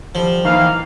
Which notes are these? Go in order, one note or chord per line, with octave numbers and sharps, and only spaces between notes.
D3 F3 G3
D#3 E3 A#3 F5